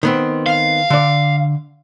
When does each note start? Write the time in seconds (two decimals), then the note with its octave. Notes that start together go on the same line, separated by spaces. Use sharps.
0.03 D#3 B3 C4
0.46 F5
0.90 D3 D5